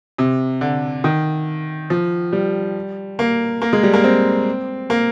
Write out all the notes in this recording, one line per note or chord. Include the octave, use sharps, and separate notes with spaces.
C3
D3
D#3
F3
G3
A#3
A#3
G#3
G3
A#3
C4
A#3